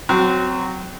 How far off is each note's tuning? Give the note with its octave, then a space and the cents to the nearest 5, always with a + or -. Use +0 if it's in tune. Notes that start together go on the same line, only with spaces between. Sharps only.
F#3 +0 C4 -20